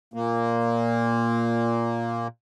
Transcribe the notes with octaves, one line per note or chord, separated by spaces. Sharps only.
A#2 A#3